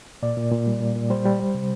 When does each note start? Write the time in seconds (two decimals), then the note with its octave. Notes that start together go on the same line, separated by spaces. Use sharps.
0.22 A#2 D5
0.37 A#2
0.52 A#2
0.67 G3
0.81 A#2
0.96 A#2
1.10 G3 C5
1.25 G3
1.40 G3
1.54 C3